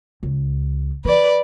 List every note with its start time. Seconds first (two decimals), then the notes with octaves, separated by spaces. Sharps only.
0.23 C#2
1.05 E3 B4 D5